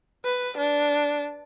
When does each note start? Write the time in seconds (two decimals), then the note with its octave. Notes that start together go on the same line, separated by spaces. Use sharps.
0.25 B4
0.57 D4